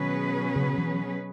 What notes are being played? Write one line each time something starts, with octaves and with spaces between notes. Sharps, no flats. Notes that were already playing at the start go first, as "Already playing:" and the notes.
Already playing: B2 D#3 F#3 C#4 G#4 B4
C#3
E3